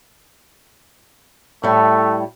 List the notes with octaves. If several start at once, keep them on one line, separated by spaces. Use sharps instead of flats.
A2 G3 A3